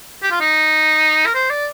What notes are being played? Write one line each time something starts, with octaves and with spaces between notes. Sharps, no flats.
G4
F4
D#4
A#4
C5
D5